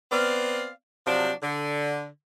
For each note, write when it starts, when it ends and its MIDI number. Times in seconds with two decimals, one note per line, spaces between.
0.12 0.70 59
0.12 0.70 60
0.12 0.70 74
0.12 0.70 77
1.06 1.31 48
1.06 1.31 53
1.06 1.31 54
1.06 1.31 62
1.42 2.07 50